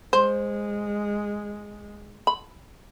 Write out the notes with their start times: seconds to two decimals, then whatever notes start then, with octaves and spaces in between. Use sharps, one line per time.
0.13 G#3 C5
2.27 B5